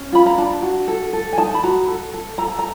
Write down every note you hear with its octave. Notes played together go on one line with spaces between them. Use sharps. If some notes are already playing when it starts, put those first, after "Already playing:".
Already playing: C#4
F4 B5
A#5
D4 A5
F#4
A4
A4
G#5
D#4 A5
B5
F#4 A#5
A4
A4
A4 A#5
A5
A#5